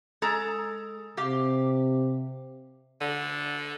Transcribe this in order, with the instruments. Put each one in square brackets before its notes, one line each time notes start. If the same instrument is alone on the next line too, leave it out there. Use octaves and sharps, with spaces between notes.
[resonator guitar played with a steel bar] G#3 A4 A#5
[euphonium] C3 [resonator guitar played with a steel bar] G4 F5
[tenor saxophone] D3